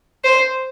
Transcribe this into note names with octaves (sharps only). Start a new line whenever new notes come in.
C5